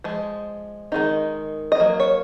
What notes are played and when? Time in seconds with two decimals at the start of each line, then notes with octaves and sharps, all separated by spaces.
0.04 F3 G#3
0.92 D#3 G#3 D#4
1.72 D#5
1.80 F#3 A#3
2.00 C#5